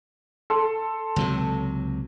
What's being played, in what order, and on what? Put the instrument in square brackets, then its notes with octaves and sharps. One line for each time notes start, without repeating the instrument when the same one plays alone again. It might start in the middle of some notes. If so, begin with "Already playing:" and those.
[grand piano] A4 C6
[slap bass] C#2 C3 F#3